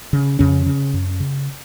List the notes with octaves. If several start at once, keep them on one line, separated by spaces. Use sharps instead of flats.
C#3
F2 C#3 C#4
C#3
F#2
C#3